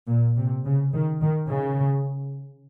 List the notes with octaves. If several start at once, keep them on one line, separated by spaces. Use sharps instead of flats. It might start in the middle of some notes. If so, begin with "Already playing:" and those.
A#2
C3
C#3
D#3
D#3
C#3